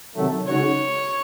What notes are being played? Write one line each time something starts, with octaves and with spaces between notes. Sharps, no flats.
C3 D#3 F#3 A3
C#3 G#3 D#4 F#4 C#5